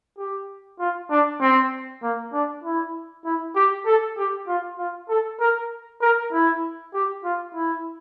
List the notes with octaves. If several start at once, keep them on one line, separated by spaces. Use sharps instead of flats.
G4
F4
D4
C4
A#3
D4
E4
E4
G4
A4
G4
F4
F4
A4
A#4
A#4
E4
G4
F4
E4